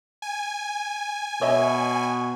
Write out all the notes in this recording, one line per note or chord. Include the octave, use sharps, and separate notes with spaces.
G#5
B2 C#5 D#5 E5